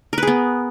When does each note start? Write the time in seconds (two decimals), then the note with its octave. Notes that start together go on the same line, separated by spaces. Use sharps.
0.13 A#4
0.18 B4
0.23 G#4
0.27 B3